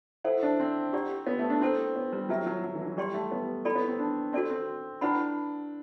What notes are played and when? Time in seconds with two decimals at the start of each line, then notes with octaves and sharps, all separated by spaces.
0.24 E4 A4 C5 F#5
0.43 D4
0.60 C4
0.93 E4 G4 D5 F#5
1.27 B3
1.39 A3
1.50 D4
1.61 C4 E4 A4 C5
1.96 B3
2.13 G3
2.29 F#3 E4 B4 E5
2.46 F#3
2.64 F#3
2.75 E3
2.82 F#3
2.86 E3
2.97 G3 G4 D5 G5 C6
3.14 A3
3.32 B3
3.65 E4 A4 D5 G5 B5
3.76 B3
3.88 C4
3.99 D4
4.33 C4 F#4 A4 D5
4.50 C4
5.01 D4 E4 B4 F#5 B5